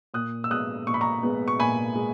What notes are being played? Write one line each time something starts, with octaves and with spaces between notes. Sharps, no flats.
A#2 D#6 F#6
E6
G#3 B3 D#6 F#6
A#2 C#6
B5
A#5 C#6
G#3 B3
C#6
A#2 G#5 B5
G#3